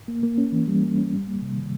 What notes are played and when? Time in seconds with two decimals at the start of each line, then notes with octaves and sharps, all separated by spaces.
0.08 A#3
0.23 A#3
0.38 C#4
0.52 E3
0.68 G3
0.83 A#3
0.98 C#4
1.13 G3
1.28 A#3
1.42 C3
1.57 D#3